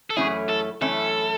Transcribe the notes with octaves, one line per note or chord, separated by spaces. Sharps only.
A4
F#2 E3 A3 C#4 E4 G#4
A4
F#2 E3 A3 C#4 E4 A4